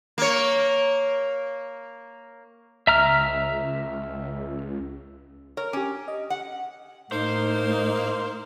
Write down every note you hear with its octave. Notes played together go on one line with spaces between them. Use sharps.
A#3 C#5
C#2 E5 A#5 F6
A#4 C#5
C#4 G4 D6
D#5
F#5
A2 A#3 D#4 C5